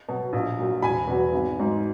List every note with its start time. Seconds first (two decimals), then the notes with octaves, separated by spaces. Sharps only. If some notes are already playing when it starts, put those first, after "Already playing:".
0.08 B2 F#3
0.33 A#1
0.58 A#2 F#3
0.82 E1 G#5 B5
1.07 E2 B2 F#3
1.33 G#1
1.58 G#2 F#3